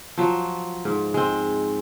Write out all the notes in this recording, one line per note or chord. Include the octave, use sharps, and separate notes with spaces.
F3 F#3
G#2
G#3 C4